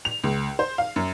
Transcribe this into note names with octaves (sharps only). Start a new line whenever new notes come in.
F7
C#2
C5
F5
F#2